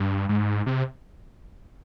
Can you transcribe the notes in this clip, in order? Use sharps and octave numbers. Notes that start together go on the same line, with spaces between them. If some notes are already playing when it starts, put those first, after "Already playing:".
Already playing: G2
G#2
C3